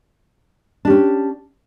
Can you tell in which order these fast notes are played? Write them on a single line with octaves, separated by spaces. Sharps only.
D4 G4 C#4